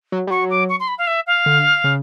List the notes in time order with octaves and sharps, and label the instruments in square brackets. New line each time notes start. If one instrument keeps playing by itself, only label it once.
[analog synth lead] F#3
G3
[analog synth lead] F#3 [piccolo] C#6
[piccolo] D6
C#6
C6
B5
F5
E5
F5
[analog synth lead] D3
C#3